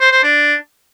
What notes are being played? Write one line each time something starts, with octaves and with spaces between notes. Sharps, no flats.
C5
C5
D4